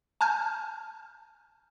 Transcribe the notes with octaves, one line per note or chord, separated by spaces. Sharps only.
G#5 A5 F6 G6